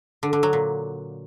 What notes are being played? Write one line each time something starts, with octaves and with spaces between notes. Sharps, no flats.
D3
D3
F#3
A#2